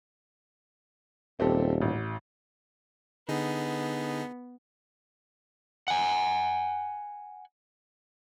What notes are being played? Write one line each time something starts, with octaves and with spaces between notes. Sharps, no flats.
D#1 C4 G4 A4
A1
D3 B3 D#4 G#4
F#5 G#5